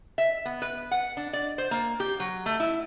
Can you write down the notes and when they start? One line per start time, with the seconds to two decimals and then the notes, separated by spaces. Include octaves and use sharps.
0.18 E5
0.45 B3
0.62 B4
0.91 F#5
1.17 D4
1.33 D5
1.58 C5
1.71 A#3
2.00 G4
2.20 F#3
2.46 A3
2.60 E4